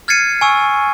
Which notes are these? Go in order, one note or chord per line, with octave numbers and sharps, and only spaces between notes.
F6 G#6 A6 C7 C#7 D#7
G#5 C#6 E6